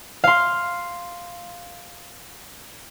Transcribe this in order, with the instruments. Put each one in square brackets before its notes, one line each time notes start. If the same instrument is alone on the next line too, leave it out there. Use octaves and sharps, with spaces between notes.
[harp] F5 C6